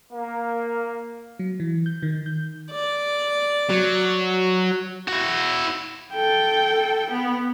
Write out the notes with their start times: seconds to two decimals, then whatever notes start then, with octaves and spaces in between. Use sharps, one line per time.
0.13 A#3
1.39 F#3
1.60 E3
1.86 G6
2.03 D#3
2.26 G6
2.72 D5
3.70 F#3
5.08 E4 F#4
6.13 A4 G5
7.11 B3